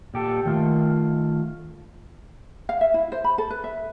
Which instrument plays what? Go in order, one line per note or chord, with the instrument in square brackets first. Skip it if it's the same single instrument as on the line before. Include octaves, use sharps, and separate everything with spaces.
[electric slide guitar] A#2 G4 A4
D#3 A3 F4
[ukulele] F5
E5
E4
C5
B5
A4
B4
E5